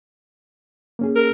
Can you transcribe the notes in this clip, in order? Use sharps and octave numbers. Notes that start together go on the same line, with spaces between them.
A#3 C#4 G#4
A#4